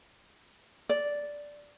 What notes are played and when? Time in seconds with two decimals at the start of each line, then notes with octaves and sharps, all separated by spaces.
0.89 D5